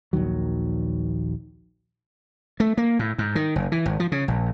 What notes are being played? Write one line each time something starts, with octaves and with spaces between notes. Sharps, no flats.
A#1 D#2 D#3 F#3
A3
A#3
A2
G#2
D#3
F#1
E3
G#1
F3
C#3
A#1